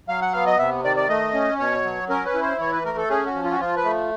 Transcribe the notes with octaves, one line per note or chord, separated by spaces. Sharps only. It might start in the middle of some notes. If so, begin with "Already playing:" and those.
F#3 F5
F#5
B3 F5
D#5
C3 E5
D#3 D5
D5
A3 D#5
C#4
B2 C#5
F#3
C#4 A#4
B4
E4
C5
E3 C#5
B4
A3 A#4
A4
C#4 G#4
F#4
F3
F4
F#4
F3 F4
B4
A3